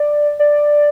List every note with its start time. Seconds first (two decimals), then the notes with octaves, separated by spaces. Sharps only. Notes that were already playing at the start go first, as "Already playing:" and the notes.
Already playing: D5
0.39 D5